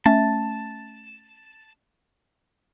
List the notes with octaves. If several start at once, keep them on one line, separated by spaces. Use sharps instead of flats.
A3 C#4 E5 A5